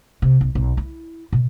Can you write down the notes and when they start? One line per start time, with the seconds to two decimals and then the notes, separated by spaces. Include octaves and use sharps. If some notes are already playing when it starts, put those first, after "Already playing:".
0.22 C3
0.41 B1
0.55 B1
0.77 E4
1.32 B2